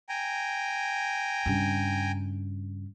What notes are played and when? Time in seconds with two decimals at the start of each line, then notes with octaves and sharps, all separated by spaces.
0.09 G5 G#5 A#5
1.46 G2 C#3